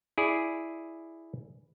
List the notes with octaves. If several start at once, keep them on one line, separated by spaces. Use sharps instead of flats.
E4 G#4 D5